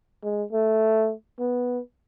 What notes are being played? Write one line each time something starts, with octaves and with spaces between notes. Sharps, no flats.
G#3
A3
B3